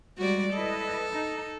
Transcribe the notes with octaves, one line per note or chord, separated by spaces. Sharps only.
G3 G#3 F#4 D5
E4 A4 B4 D#5
D#4